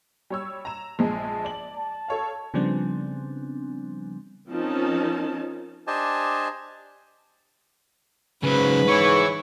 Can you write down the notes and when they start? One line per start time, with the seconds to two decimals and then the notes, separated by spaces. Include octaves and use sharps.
0.30 G3 C#5 E6
0.65 A#5 E7
0.99 A#1 G#3 G#4 A5
1.45 D5 F#7
1.77 A5
2.08 A4 C#5 F5
2.54 C#3 F3 G3 B3 C4 D4
4.49 F3 C4 C#4 D#4 A#4 A5
5.87 D4 G4 C5 D#5 G#5 A5
8.43 G#2 C#3 F#3 B4
8.88 E3 C#5 C#6